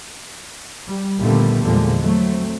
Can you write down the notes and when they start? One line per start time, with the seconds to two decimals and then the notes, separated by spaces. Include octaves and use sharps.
0.87 G3
1.19 D#2 A#2 D3 G3 A3 B3
1.64 E2 A#2 D3 F3 G3 G#3
2.02 F#3 A3 C4